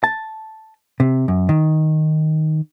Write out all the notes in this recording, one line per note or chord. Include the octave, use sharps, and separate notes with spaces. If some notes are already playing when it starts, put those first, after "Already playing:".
A5
C3
F#2
D#3